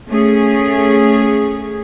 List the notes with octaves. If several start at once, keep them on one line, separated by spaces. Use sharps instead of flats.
A3 C#4 G#4